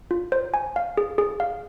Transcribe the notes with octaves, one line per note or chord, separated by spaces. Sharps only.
F4
C5
G#5
F5
G#4
G#4
F5